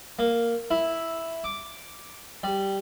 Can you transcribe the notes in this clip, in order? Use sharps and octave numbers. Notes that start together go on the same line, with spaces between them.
A#3
E4
D6
G3